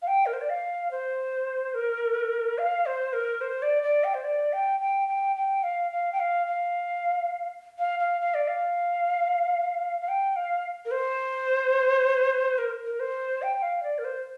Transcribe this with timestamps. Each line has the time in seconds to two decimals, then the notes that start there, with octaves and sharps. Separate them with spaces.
0.02 F5
0.07 G5
0.26 A#4
0.33 C5
0.41 D5
0.50 F5
0.91 C5
1.74 A#4
2.58 F5
2.86 C5
3.13 A#4
3.41 C5
3.62 D5
3.83 D5
4.04 G5
4.14 C5
4.24 D5
4.53 G5
4.80 G5
5.08 G5
5.36 G5
5.63 F5
5.92 F5
6.12 G5
6.20 F5
6.47 F5
7.79 F5
7.99 F5
8.21 F5
8.34 D5
8.48 F5
10.01 F5
10.08 G5
10.36 F5
10.85 A#4
10.91 C5
12.58 A#4
12.85 A#4
13.00 C5
13.42 G5
13.62 F5
13.83 D5
13.99 A#4
14.05 C5